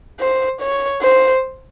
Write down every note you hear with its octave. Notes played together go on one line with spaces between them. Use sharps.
C5
C#5
C5